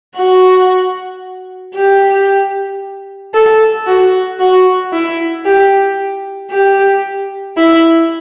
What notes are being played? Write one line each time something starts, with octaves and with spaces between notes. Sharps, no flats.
F#4
G4
A4
F#4
F#4
E4
G4
G4
E4